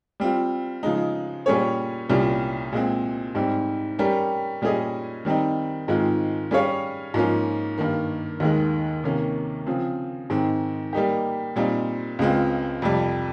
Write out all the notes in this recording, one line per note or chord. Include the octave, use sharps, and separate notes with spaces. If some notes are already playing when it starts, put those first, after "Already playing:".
G3 C4 F4
C#3 F3 G#3 D#4
A#2 G3 C#4 G#4 C#5
C2 A#2 G3 C#4 F4
A#2 G#3 C4
G#2 G3 C4
G3 C#4 G4 A#4
A#2 G3 C#4 G#4 D#5
D#3 G3 C4 D#4
G#2 D#3 G#3 C4 F4
G3 C#4 G#4 C#5 F5
G#2 F3 A#3 C#4 F4
G2 D#3 A#3
D#2 D#3 G#3
C3 D#3 A#3 C#4
C#3 F3 C4
G#2 D#3 G#3 C4
G3 A#3 D#4 G4
A#2 G3 C4 D#4
C#2 C#3 G#3 C4 F4
F2 C3 G3